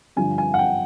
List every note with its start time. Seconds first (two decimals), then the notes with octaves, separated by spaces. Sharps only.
0.16 G2 D3 F3 G#5
0.38 G#5
0.54 F#5
0.59 G5